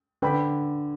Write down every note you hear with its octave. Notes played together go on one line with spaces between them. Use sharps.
D3 D4 B4 G5 B5